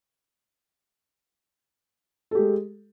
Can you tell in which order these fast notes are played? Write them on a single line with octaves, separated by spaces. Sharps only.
A4 G4 G#3